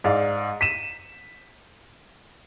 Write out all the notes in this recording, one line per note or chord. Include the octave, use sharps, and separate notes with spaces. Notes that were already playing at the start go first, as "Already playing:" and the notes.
G#2 D5 F5
B6 D#7 E7